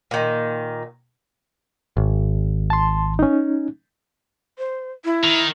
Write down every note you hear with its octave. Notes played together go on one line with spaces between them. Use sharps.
A#2 D#3
G#1
A5 C6
C#4 D#4
C5
E4
D#3